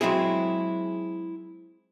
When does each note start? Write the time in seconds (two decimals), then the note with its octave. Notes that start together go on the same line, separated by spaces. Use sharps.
0.01 F#3 G#3 C4 E4 G#4